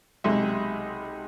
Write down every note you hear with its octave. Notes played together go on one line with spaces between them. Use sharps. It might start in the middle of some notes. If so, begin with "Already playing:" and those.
B1 C3 G#3 D#5 E5